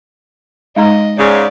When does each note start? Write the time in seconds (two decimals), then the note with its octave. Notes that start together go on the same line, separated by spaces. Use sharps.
0.76 G#3 D#4 D#5 A#5
1.19 G#2 C#3 D5